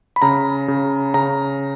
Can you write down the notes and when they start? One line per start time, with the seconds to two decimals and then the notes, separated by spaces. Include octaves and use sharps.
0.16 B5
0.22 C#3 A#5
0.68 C#3
1.14 C#3 A#5